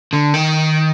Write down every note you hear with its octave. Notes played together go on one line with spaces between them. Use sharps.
D3
D#3